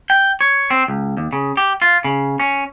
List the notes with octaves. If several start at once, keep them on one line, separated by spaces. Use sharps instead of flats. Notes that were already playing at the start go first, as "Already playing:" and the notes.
G5
C#5
C4
C#2
D#2
C#3
G4
F4
C#3
C#4